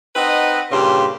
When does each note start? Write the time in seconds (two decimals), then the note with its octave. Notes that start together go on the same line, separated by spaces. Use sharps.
0.16 C4 D#4 B4 D#5 F#5
0.71 G2 A#2 C#3 G4 C6